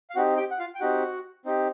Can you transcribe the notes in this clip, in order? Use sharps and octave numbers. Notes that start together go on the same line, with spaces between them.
F5
C4 D#4 F#4 G4 F#5
G4 G5
F#5
F4 F5
G5
C4 D#4 F#4 G4 F#5
C4 D#4 G4